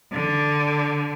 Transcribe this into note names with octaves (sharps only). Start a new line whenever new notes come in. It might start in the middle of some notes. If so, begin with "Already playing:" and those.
D3